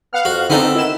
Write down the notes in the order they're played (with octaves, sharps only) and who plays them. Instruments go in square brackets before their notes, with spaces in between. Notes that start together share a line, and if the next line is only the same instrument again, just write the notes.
[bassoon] B3 [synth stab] F5 F#5 F6
[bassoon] F2 [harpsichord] F#4
[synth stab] D3 D#4 [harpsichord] B3 C4 A4
[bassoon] D#3 [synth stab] E4 E7